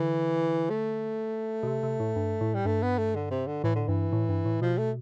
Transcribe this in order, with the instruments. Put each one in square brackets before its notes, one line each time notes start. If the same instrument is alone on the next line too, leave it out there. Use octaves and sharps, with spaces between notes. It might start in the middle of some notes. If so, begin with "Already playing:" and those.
Already playing: [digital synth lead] D3 [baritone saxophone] E3
[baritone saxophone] A3
[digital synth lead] B2
C3
C3
A2
G2
A2
[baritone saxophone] G3
[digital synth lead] G2 [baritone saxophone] A3
[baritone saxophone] B3
A3
D3
C3
D3
[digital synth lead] A2 [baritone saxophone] E3
[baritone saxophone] D3
[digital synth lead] G2 [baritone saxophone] E3
[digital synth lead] A2
G2
A2
[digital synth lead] B2 [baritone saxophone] F3
[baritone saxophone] A3